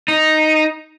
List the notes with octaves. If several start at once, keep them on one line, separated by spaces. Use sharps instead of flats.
D#4